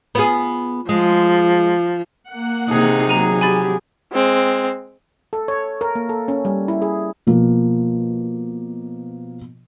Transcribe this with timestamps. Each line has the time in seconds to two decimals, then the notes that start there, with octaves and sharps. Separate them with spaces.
0.15 B3 F4 G#4
0.89 F3 G#3
2.31 A#3 F#5
2.70 C3 D#4 G#4
3.09 F#3 G#4 A#5 D#7
3.41 G4 G#5 B5 A6
4.13 G#3 C4
5.33 A4
5.48 C#5
5.81 A#4
5.95 A#3
6.09 A4
6.28 C#4
6.45 G3
6.68 E4
6.82 G#4
7.27 B2 F3 A#3